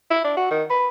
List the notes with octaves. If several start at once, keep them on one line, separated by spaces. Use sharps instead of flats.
E4
D4
F#4
D#3
B4